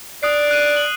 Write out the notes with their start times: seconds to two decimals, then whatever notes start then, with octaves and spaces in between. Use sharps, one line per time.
0.23 D5 D#6 F#6 C7
0.51 F#6 D#7
0.77 F#7